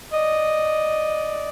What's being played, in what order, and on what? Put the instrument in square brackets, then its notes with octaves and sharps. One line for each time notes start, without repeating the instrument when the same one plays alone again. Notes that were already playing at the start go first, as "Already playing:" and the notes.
[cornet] D5 [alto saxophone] D#5